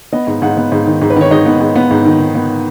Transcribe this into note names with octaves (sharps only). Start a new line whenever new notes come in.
B3 D#5
G#2
G#2 F#5
B3
G#2
D#3
G#2
B4
D#3 C#5
G#2 D#5
B3
G#2
B3
G#2
D#3
D#3
B3